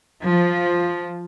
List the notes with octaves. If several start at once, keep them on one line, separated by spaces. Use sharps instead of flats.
F3